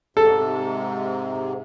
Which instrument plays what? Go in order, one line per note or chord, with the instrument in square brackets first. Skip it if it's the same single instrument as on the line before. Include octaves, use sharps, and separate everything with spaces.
[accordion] G#2 C3 [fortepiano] A4